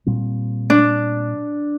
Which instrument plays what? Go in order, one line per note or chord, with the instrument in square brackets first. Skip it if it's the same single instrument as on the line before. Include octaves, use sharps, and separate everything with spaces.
[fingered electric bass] A#2 G3 C4
[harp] D4